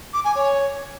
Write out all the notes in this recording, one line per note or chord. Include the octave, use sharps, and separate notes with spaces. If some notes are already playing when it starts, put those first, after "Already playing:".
D6
G#5
C#5